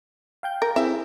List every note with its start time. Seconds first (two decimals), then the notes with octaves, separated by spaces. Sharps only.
0.43 F5 G5 G6
0.62 A#4
0.76 C4 E4 G#4 E5